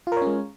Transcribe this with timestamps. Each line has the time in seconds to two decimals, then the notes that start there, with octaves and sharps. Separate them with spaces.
0.07 F4
0.12 A#4
0.17 C#5
0.22 C#4
0.27 G#3